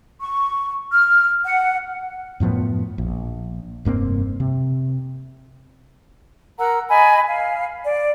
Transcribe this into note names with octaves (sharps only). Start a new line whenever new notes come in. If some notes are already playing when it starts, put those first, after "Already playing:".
C#6
F6
F#5
F#2 A2 F3 B3
A#1
F1 G2 A#3 C4
C3
A#4 F#5 A#5 E6
D#5 G#5 B5
F5
D5